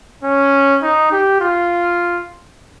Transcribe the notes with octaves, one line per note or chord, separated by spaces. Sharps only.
C#4
D#4
G4
F4